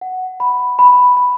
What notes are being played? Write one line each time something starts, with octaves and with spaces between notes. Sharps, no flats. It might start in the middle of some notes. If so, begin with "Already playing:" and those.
F#5
B5
B5
B5